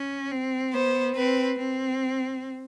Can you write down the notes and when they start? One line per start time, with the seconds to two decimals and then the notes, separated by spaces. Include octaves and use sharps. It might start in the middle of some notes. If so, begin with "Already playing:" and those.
Already playing: C#4
0.31 C4
0.73 B3 C5
1.16 C4 B4
1.59 C4